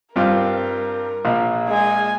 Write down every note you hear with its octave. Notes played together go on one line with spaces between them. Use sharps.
G2 C4 F4 A#4
A#1 A#2
G#3 G#5